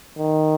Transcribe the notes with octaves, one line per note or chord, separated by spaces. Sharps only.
D#3